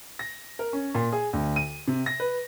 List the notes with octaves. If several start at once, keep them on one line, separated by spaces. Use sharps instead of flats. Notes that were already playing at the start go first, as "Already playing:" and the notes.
A#6
A#4
C#4
A#2
G#4
D2
D#7
C3
A#6
B4